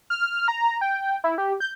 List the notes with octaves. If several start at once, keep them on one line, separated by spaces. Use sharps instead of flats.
F6
A#5
G5
E4
G4
G6